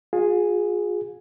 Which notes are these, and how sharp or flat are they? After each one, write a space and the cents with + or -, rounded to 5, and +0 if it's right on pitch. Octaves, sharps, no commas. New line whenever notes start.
F4 +40 G#4 +0